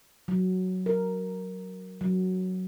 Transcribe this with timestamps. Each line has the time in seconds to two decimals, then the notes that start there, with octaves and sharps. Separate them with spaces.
0.28 F#3
0.86 A#4
2.01 F#3